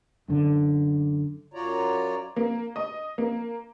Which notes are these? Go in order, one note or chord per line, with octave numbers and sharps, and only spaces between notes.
F#2 D3
F#2 F4 F#4 C#5 D5 A#5
A#3
D#5
A#3